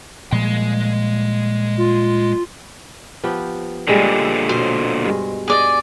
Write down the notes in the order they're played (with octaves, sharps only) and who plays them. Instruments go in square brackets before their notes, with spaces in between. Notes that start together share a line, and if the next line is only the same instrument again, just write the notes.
[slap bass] A#2 F3 G3 [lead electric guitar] G#3 C6
[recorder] F4
[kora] F3 B3 G4
[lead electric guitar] A#2 D3 [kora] G3 G#3 G4
[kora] B2 [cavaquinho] C5
[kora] G2 G#3
[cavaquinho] G#4 D5 D#5